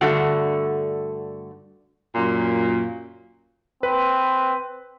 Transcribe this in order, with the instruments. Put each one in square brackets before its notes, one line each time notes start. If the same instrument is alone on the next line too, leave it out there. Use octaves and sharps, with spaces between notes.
[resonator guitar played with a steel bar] G2 D3 A3 F#4
[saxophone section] F#2 A#2
[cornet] C4 [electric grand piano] B4